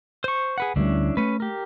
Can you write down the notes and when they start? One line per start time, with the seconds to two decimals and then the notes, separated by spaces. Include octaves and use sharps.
0.24 C5 C#6
0.58 G#4 B4 F#5
0.76 D2 G3 A3 C#4 D4 E4
1.17 A3 C#4 B4
1.40 G4 A#4